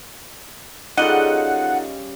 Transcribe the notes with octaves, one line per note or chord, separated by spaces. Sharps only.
C#3 G3 D#4 F4 A4 D#5 F#5